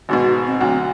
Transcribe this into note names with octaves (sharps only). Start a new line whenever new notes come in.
G#1 G#2 B2 F#4
C4
D2 F#3